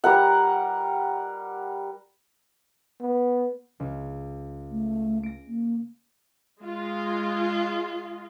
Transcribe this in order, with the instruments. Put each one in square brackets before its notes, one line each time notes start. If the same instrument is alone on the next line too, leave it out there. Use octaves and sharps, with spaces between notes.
[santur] G3 A#4 F#5
[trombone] B3
[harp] C#2
[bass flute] A3
[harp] A#6 D7
[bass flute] A#3
[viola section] G#3 F4